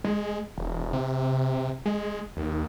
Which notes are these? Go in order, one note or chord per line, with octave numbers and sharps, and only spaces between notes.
G#3
E1
C3
G#3
D#2